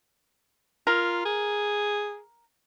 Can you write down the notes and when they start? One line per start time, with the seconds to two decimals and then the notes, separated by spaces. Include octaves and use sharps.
0.87 F4 A#4
1.25 G#4